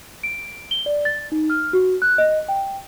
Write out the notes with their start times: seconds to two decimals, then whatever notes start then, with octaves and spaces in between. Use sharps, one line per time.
0.23 D7
0.71 G7
0.86 D5
1.05 A6
1.32 D#4
1.50 F6
1.73 F#4
2.02 F#6
2.18 D#5
2.48 G5